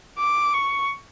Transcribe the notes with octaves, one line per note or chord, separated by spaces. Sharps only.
D6
C#6